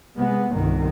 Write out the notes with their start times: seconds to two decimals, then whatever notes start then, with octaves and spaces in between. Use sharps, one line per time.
0.16 C3 G#3 B3
0.52 G1 C2 D#3